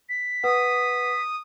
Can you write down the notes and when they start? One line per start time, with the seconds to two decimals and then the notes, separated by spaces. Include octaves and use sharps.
0.09 B6
0.43 B4 F#5 D#6